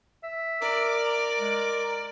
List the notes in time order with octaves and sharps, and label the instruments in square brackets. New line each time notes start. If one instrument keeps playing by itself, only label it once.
[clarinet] E5
[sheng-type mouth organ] A#4 D6 [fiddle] D5
[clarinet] A#5
G#3